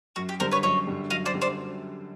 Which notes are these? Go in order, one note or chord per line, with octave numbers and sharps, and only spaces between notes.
F#2 F#4
G4
D3 G3 A#4 C5
B4 C#5
F#2 C#5 D#5
D3 G3
F#2 D#5 F5
C5 D5
D3 G3
C5 D5